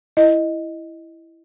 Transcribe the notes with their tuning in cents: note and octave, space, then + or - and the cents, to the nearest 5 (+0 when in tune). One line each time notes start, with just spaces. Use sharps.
E4 +5 D#5 +0